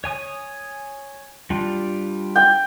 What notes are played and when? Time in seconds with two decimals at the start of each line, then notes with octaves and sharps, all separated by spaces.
0.04 C#5 G#5 D#6
1.50 G3 D4 F4
2.36 G5